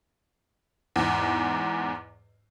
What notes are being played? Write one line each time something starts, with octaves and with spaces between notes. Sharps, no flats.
E2 G#2